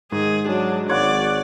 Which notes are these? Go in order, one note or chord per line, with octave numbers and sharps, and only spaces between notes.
G#2 D#3 G#4
F#3 D4
G#1 C#5 D5 F#5 C#6